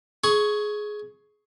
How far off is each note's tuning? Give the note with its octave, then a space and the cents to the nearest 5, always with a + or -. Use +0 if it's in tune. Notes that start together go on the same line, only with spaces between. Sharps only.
G#4 +15 C#6 +0